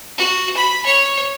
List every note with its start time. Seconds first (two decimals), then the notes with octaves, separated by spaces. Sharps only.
0.18 F#4
0.57 B5
0.86 C#5